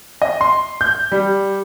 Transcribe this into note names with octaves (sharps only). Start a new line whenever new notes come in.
D#5
C6
G6
G3